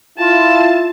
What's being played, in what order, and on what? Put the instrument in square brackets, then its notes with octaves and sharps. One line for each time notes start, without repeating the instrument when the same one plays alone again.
[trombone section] E4 F4 [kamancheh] A5